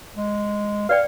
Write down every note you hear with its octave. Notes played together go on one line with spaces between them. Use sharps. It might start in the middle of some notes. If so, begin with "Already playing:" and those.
G#3
B4 D5 F5 G5